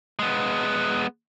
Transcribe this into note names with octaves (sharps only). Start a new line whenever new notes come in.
G#3 B3